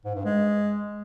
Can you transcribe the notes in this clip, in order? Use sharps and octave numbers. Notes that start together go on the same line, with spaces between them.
G#2
G2
G#3